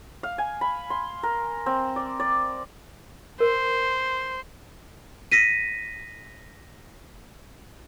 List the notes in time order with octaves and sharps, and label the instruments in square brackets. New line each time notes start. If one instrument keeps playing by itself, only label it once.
[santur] F5
G#5
B5
C6
A#4
C4
D5
D5
[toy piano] A#4 [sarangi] C5
[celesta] A#6 B6 D#7